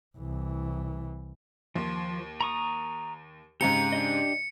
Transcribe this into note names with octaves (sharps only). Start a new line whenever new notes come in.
C2 E3
D#2 F3
A#5 C#6 D#6
G#2 C#3 C4 G4 A#5 C#7
D4 G4 D#5